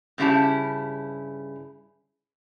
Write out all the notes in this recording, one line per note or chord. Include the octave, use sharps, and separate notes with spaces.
G2 C#3 E4 F#4 G4 A5